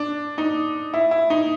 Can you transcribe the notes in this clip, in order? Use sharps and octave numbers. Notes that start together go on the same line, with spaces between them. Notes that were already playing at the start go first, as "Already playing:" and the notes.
Already playing: D4
D#4
E4
E4
D#4